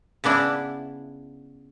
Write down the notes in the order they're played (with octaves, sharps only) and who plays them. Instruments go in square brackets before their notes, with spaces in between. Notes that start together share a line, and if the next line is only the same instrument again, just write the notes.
[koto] C#3 B3 D4 E4